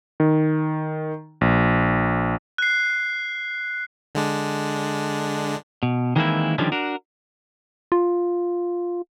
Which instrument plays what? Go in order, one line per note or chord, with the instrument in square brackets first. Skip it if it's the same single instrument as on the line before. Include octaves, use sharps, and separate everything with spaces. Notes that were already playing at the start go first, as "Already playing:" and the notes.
[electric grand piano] D#3
A#1
[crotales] F#6 C7
[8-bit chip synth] D3 G#3 D4
[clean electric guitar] B2
D#3 E3 G#3 A#3 C4 E4
D3 D#3 F3 G3 C#4 D4
D4 F#4 A#4
[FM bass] F4